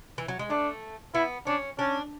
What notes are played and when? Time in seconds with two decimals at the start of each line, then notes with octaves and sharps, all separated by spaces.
0.18 E3
0.28 F#3
0.39 G#3
0.49 A3 D4
1.14 B3 E4
1.47 C#4 D4
1.79 C#4 D4